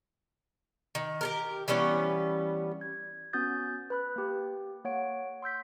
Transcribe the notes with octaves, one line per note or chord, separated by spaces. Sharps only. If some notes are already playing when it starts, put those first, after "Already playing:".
D#3
G4 A4 A#4
E3 G3 B3 C#4
G#6
B3 C#4 F#4 D#6 G6 A6
B4 B5 F#6
A#3 G4
A#3 C#5 F#5 D7
C6 E6 G6 B6